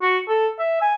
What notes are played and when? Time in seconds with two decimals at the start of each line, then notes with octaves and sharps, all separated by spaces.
0.02 F#4
0.28 A4
0.59 E5
0.81 G#5